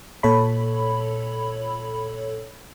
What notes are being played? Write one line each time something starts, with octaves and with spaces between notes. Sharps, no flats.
A#2 A4 C#5 B5